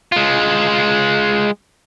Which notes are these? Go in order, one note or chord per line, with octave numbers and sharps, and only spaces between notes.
G#3 F4